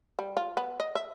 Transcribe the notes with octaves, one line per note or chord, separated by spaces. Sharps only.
G3
F4
B3
D#5
E5